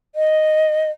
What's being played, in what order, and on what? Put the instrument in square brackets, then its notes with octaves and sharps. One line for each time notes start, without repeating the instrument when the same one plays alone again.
[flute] D#5